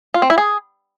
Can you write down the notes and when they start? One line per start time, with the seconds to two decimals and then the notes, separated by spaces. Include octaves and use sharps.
0.14 F4
0.22 C4
0.30 E4
0.38 G#4